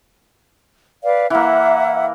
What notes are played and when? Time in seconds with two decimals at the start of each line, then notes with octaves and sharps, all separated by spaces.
1.03 B4 D5 F5
1.30 E3 A#3 E5 F#5